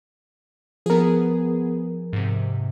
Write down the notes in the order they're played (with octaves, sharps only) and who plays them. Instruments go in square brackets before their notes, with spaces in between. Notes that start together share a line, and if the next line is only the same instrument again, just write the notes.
[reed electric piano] F3 A#4 [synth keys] B3 G#4
[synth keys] G#2 C3